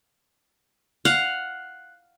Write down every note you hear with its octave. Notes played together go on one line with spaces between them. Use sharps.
F5 F#5